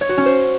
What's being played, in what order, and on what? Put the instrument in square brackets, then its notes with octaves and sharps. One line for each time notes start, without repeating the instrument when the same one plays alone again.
[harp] C#5
F#4
C#4
C5